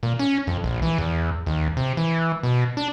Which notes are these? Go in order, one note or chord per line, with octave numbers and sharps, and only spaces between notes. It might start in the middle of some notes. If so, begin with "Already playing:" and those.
A#2
C#4
F2
A#1
E3
E2
D#2
C3
E3
B2
D4